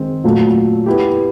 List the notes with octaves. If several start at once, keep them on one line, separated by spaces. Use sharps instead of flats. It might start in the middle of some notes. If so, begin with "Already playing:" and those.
Already playing: D#3 G#3 C4
A#2 F#3 A3
B3 E4 G4